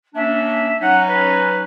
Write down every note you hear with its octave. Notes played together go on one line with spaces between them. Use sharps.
A#3 C#4 D4 E5
F#3 C#4 D#4 F#5
B4